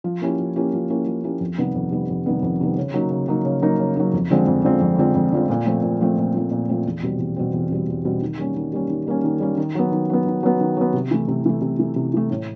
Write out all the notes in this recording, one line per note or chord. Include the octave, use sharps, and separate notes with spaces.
F3
A#3 C#4 E4 G4
F3
A#3 C#4 E4 G4
F3
A#3 C#4 E4 G4
F3
A#3 C#4 E4 G4
F2
C3 D#3 G3 B3
F2
C3 D#3 G3 B3
F2
C3 D#3 G3 B3
F2
C3 D#3 G3 B3
C#3
F#3 A#3 D#4
C#3
F#3 A#3 D#4
C#3
F#3 A#3 D#4
C#3
F#3 A#3 D#4
F2
D3 F3 G#3 C4
F2
D3 F3 G#3 C4
F2
D3 F3 G#3 C4
F2
D3 F3 G#3 C4
A#2
F3 A3 C4
A#2
F3 A3 C4
A#2
F3 A3 C4
A#2
F3 A3 C4
E2
B2 G3 C4
E2
B2 G3 C4
E2
B2 G3 C4
E2
B2 G3 C4
D#3
G3 A#3 C#4
D#3
G3 A#3 C#4
D#3
G3 A#3 C#4
D#3
G3 A#3 C#4
D#3
F#3 B3
D#3
F#3 B3
D#3
F#3 B3
D#3
F#3 B3
C3
E3 A3
C3
E3 A3
C3
E3 A3
C3
E3 A3
A2